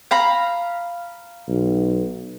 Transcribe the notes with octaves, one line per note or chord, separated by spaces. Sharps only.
F5 A#5 B5
B1